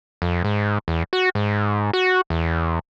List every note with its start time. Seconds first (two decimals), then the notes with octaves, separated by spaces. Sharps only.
0.22 F2
0.44 G#2
0.88 E2
1.13 F#4
1.35 G#2
1.93 F#4
2.30 E2